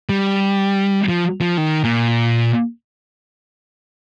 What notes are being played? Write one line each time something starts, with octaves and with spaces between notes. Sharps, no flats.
G3
F3
F3
D#3
A#2